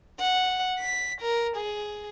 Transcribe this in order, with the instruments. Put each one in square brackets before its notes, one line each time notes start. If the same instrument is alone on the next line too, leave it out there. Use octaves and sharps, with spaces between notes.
[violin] F#5
B6
A#4
G#4